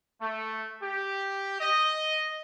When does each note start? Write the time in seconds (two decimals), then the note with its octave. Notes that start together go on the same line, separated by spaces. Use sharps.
0.19 A3
0.81 G4
1.60 D#5